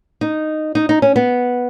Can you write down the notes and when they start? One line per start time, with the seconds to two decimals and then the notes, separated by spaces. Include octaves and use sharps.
0.21 D#4
0.75 D#4
0.89 D#4
1.02 C#4
1.16 B3